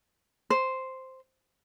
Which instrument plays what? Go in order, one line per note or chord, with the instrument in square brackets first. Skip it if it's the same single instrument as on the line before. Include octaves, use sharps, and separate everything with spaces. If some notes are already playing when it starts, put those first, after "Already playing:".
[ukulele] C5